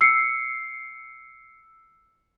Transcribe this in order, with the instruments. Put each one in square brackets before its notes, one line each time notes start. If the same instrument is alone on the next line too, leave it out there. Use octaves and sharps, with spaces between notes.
[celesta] E6 C7 C#7